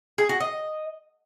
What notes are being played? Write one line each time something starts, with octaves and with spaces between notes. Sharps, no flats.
G#4
F#4
D#5